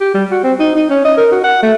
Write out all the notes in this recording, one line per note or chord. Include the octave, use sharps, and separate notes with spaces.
G4
G3
F#4
C4
D#4
D#4
C#4
D#5
A#4
F#4
F#5
A3